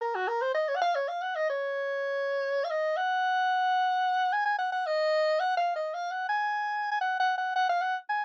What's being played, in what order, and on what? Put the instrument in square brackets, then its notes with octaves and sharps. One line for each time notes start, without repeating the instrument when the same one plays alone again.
[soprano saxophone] A#4
F#4
A#4
C5
D#5
C#5
F#5
F5
C#5
F5
F#5
D#5
C#5
F5
D#5
F#5
G#5
G#5
F#5
F#5
D#5
F#5
F5
D#5
F5
F#5
G#5
G#5
F#5
F#5
F#5
F#5
F5
F#5
G#5